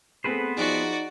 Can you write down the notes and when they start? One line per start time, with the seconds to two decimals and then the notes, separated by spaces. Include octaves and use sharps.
0.24 A3 B3 C4 G#4 B4 C5
0.57 F3 D#4 F#4 G#4 D5